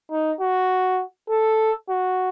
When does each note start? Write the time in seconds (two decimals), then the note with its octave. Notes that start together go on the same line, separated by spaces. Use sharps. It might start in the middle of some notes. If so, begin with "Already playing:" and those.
0.11 D#4
0.40 F#4
1.30 A4
1.89 F#4